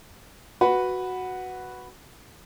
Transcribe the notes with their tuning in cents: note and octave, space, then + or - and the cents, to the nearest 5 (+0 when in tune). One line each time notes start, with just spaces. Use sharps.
F#4 +0 B4 +0